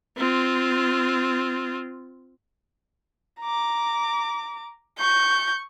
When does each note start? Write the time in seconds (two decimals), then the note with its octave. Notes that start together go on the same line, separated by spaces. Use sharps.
0.17 C4 F4
3.41 A#5 D6
5.00 C#6 G6